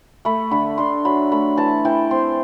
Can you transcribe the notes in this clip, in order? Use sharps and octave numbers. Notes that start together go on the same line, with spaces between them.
A3 B5
D3 B5
D3 C6
F#3 B5
A3 B5
E3 A5
E3 G5
C4 C6